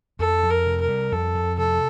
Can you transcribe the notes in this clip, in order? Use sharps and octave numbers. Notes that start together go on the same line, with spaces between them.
F2 A4
F2
A#4
C3
A#4
G3
F2 A4
F2
C3 A4